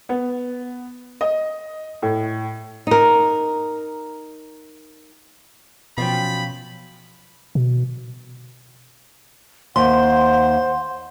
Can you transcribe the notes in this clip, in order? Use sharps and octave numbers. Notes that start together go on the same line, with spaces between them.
B3
D#5
A2
D#4 A#4
B2 F3 F#3 C#4 F4 C#5 G5 B5
B2
D#2 C5 F#5 C6